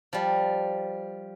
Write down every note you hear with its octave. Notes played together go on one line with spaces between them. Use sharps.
F3 G3